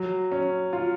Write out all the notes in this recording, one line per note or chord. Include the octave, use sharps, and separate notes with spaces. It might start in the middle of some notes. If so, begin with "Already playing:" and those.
Already playing: F#3
C#4
F4